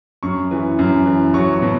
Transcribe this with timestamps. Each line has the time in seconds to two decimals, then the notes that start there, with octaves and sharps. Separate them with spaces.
0.23 F#2 C#6
0.51 E3
0.79 F#2
1.06 E3
1.34 F#3 C#6
1.53 C#6
1.62 B2